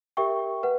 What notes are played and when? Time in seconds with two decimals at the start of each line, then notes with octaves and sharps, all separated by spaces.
0.17 G4 A#4 E5 G5 C#6
0.63 B4 F#5